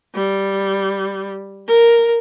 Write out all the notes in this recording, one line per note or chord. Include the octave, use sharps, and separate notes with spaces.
G3
A#4